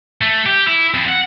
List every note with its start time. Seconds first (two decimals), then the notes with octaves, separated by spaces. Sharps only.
0.21 A3
0.46 G4
0.67 E4
0.94 F2
1.09 F#5